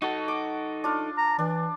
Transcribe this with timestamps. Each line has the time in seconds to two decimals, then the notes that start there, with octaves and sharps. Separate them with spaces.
0.02 D#4 F#4 A4
0.28 D6
0.84 D4 F4
1.17 A#5
1.39 E3 D4